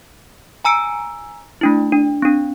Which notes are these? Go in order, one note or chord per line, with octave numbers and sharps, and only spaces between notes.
G#5 A#5 E6 C#7 D7
A3 D4 E4
D4
C4 D4